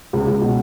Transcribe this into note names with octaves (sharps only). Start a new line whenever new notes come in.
C#2
C#2
B2